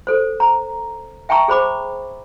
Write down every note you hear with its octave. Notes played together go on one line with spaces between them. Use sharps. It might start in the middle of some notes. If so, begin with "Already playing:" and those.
A4 C5
A#5
E5 G5 A5 A#5 C#6 E6
G#4 C5 B5 D6